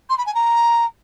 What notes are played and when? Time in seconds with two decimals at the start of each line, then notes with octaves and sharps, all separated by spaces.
0.09 C6
0.18 B5
0.26 G#5
0.34 A#5